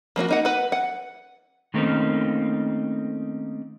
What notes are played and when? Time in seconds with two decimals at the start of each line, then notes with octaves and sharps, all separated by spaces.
0.16 F3 A#3 D4 F#4
0.29 A#3 D#4 F#5
0.45 B4 F#5
0.72 F#5
1.74 D#3 A3 A#3 C4 C#4 D#4